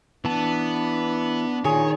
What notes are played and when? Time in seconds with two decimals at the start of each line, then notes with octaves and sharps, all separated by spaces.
0.25 E3 B3 D4 A5
1.65 A#2 D#3 G#4 C#5